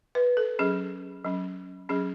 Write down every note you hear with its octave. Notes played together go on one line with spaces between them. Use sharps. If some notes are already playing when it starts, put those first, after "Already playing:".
B4
A4
F#3 C#4 G#4
F#3 C#4
F#3 C#4 G#4